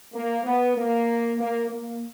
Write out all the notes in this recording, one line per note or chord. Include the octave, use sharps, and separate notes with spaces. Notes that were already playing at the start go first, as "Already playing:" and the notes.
A#3
B3
A#3
A#3
A#3